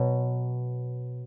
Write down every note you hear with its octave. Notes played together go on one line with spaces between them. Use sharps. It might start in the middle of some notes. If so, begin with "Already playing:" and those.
Already playing: B2 F#3